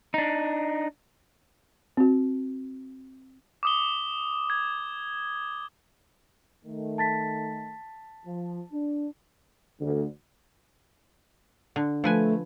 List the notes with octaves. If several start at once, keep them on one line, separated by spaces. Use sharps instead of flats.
D4 D#4
C4 F#4
D6 D#6 G7
G#6
D#3 A3
A5 A6 B6
F3
D4
D2
D3
F3 A3 B4 G#5